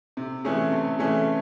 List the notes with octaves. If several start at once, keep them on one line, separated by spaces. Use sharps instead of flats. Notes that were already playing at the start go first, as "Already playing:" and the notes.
C3
E3 A3 C#4 G#4
C3
E3 A3 C#4 G#4